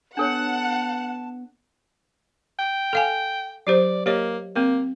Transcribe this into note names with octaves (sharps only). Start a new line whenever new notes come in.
B3 D4 A4 C#5 F#5 A5
G5
A4 F5 G#5
F#3 G4 C5 D5
A#3 G4 C#5 D#5
A#3 C4